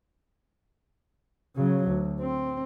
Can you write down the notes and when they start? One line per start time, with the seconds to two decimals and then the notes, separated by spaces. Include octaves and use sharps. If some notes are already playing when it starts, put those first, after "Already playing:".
1.56 C#3 F#3
1.89 D2
2.20 C4